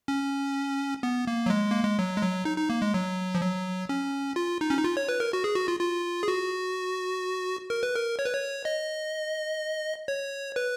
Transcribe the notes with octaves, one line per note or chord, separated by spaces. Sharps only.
C#4
B3
A#3
F#3
G#3
A#3
G#3
F#3
G#3
F#3
D#4
D#4
A#3
G#3
F#3
F3
F#3
C#4
F4
D#4
C#4
D#4
F4
C#5
B4
A#4
F#4
G#4
F#4
F4
F4
G#4
F#4
A#4
B4
A#4
C#5
B4
C#5
D#5
C#5
B4